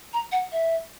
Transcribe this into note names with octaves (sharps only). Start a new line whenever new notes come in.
A#5
F#5
E5